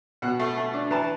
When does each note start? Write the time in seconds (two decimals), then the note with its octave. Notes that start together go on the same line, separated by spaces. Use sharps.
0.22 B2 F#5
0.39 A3
0.57 A3
0.74 D4
0.91 E3 A5